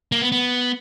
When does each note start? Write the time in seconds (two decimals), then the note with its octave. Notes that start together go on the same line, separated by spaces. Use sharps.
0.12 A#3
0.21 B3
0.32 B3